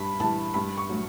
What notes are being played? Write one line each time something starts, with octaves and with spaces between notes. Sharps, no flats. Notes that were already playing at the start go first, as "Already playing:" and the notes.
Already playing: G2 A5 B5
E3 G3 A5
G2 B5
C#6
F#3 A3